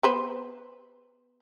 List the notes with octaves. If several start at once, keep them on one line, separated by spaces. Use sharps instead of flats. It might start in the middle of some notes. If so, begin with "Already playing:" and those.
B3 B4 C5